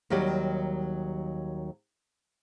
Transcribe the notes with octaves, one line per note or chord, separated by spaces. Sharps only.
D#2 D#3 F#3 G3 G4